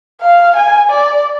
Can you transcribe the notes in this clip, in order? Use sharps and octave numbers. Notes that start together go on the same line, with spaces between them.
F5
G#5
D5